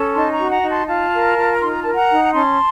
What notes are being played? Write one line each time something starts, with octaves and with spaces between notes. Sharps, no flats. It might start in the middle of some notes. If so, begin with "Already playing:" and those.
Already playing: C#4 A4
D#4 A5 C6
A#5 C#6
F#4
F#5 A#5
D#4
A5 C6
F4 F5 A5
A#4
F4
D#4 C6
A#5
A#4 A5
F#5 A#5
D#4
A#5
C#4 A5 C6